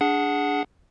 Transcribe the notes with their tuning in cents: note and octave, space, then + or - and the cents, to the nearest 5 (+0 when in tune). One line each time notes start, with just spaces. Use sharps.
D4 -10 G#4 +0 F#5 +0